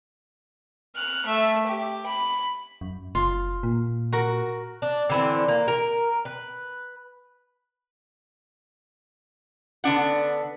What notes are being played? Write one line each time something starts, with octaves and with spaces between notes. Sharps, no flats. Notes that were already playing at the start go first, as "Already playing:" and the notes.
F6 F#6
A3 E5
G4
B5
F#2
F#1 F4
A#2
F#4 A#4
D4
D3 E3 C4
A#3
A#4
B4
D3 B3 D4 F#5